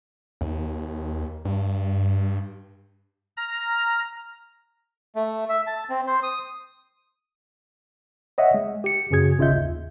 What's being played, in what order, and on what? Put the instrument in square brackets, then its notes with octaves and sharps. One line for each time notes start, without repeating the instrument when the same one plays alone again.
[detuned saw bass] D#2
G2
[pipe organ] A#5 F6
[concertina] A3
E5
A5
C4
C5
D#6
[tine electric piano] C#5 D#5 E5 F#5
G#3
G4 C#7
F#2 C#3 F#4 G#4 G#6
G#1 C#3 F4 D#5 E5 G6
D#2